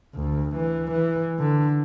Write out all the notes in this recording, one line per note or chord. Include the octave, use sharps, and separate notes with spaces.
D2
E3
E3
D3